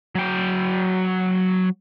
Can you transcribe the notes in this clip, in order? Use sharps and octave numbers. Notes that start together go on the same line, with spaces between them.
F#3 G5